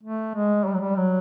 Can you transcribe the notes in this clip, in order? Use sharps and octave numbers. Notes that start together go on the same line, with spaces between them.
A3
G#3
G3
F#3
G3
F#3